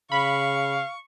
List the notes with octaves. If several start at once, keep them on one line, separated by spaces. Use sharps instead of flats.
C#3 F5 B5 C#6